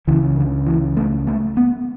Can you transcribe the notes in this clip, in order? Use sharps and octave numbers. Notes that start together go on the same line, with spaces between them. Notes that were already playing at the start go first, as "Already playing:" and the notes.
C#2 C#3 E3
D3
E3
A3
A3
B3